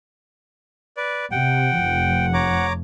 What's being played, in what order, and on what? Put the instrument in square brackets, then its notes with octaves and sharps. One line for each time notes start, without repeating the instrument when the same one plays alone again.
[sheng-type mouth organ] B4 D5
[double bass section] C3 [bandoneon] F#5 [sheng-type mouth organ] G5
[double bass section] F1 F3
[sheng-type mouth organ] C#5 A#5 D6